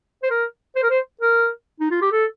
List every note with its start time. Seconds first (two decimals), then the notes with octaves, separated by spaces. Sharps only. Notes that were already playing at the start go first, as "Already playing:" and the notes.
0.23 C5
0.30 A#4
0.76 C5
0.83 A#4
0.90 C5
1.21 A#4
1.80 D#4
1.91 F4
2.02 G4
2.12 A4